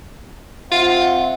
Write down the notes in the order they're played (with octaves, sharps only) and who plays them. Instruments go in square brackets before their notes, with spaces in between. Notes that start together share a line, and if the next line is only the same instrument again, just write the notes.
[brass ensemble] C4 E5 F#5 [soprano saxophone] F4